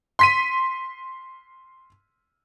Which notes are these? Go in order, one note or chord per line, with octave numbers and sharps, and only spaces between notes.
C6 B6 D#7